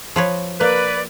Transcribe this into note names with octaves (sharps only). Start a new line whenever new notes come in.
F3 B4 C#5
A#3 B4 D5